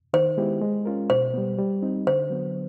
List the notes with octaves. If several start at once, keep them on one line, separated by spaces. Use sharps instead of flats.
D#3 C5
G#3 B3 E4 G4
G#3
C#4 F4 A#4
B2 C5
G3 B3
G3
C4 D#4
D3 C5
F#3 B3